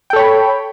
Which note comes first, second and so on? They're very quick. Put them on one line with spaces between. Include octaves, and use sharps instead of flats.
G5 A4 C#5 B5